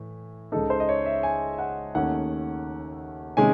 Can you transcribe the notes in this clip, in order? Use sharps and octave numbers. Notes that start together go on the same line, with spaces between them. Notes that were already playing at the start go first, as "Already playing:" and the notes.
Already playing: A2 E3
C#2 C#3 G#3 D#4 A4
C5
D#5
C#5
E5
G#5
F#5
D#2 D#3 A3 C#4 F#5
C3 D#3 G#3 C#4 G#5